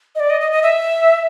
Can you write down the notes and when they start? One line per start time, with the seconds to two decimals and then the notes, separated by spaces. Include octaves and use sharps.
0.15 D#5
0.20 D5
0.30 D#5
0.41 D#5
0.52 D#5
0.63 E5